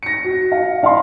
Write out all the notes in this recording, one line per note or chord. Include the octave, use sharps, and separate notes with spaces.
A#6 C#7
F#4
F5
D5 F5 A5 B5 C6